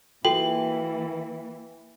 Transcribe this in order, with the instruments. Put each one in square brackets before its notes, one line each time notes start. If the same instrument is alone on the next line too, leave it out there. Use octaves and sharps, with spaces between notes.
[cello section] E3 A#3 [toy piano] F4 F#4 A4 [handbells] G5 [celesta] F#7